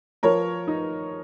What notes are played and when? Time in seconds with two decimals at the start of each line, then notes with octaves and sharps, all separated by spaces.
0.23 F3 A#4 C#5
0.67 D#4